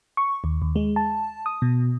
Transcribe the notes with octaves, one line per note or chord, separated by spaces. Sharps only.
C#6
D#2
D#2
G#3
A5
D#6
B2